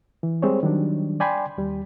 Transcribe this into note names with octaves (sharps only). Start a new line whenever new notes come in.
E3
G3 G#3 C4 G#4 C5 C#5
D#3 F#3 G3 D4
D5 G5 G#5 B5 C6
D#2 G3